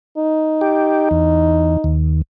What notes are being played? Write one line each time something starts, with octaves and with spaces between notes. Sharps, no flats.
D#4
G4
E2
D#2